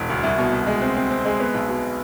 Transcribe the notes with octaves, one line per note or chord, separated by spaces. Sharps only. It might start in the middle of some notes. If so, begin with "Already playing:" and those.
Already playing: E1
D2
C2
B2
C2
G#3
C4
C4
C4
G#3
B3
B1
B2